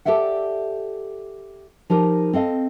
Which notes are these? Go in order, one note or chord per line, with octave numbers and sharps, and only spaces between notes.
G4 A4 D5 E5 F#5
F3 D#4 G4 A#4
C4 A4 D#5 F5